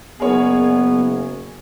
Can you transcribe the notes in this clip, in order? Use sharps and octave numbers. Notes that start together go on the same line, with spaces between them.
F#1 B3 G#4 A#4 C#5